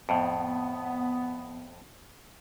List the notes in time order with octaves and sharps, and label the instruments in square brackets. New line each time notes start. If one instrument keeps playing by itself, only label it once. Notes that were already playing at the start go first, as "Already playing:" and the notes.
[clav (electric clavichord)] F2 A2 [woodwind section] B3